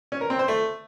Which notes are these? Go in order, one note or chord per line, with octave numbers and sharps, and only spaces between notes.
C#4
A#4
C4
C5
A3